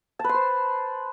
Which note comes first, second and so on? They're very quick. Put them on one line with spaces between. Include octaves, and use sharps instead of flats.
A5 B4 C6 C5